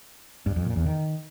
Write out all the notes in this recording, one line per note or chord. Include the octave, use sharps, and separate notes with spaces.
G2
F2
A#2
E2
D#3